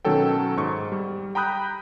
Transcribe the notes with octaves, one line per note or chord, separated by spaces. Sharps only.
B2 D#3 F#3 C#4 A4 G5
G#2 C#6
G3
G5 A#5 B5 D#6 F#6 G6